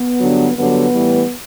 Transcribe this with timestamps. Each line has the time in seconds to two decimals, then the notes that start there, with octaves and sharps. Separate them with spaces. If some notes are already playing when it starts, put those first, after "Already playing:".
Already playing: B3
0.20 G2 D3 F#3
0.56 G2 D3 F#3 B3
0.93 A2 E3 G3